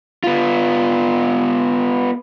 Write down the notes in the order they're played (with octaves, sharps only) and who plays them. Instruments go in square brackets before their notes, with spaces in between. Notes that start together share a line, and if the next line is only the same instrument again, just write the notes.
[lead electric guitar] B3 F4